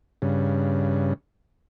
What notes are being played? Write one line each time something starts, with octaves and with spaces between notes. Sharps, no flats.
G2 C#3